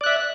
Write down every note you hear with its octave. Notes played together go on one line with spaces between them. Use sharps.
D5 E5 F#6